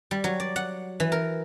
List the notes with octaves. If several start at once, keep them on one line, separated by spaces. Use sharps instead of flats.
G3
F#3
D5
F#5
E3
A#4